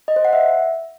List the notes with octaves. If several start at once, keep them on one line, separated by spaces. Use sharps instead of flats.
D#5
C5
F#5
E5